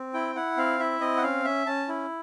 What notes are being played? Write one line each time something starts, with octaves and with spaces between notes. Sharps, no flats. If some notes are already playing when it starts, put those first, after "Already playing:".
Already playing: C4
E4 G5
E4 F#5
C4 F5
E4 E5
C4 D#5
F#5
C#4 F5
C#4 E5
C#4 A5
E4